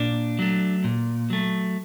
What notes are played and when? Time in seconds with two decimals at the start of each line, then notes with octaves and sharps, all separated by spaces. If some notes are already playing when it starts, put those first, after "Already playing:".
Already playing: A#2 D4
0.39 F#3 A3
0.84 A#2
1.30 F#3 A3